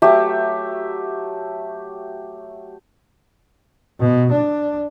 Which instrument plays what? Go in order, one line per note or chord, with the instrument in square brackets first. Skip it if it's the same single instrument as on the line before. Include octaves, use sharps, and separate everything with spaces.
[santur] F#3 A3 G4 E5
[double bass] B2
D4